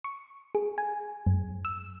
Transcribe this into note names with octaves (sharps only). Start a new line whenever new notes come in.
C#6
G#4
G#5
F#2
E6